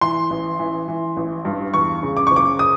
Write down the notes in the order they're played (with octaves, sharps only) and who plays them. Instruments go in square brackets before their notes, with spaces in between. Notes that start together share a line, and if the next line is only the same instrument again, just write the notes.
[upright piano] E3 C6
A1
E3
E3
A1
G2
E2 C#6
C#3
D6
F#1 C#6
D6
D#6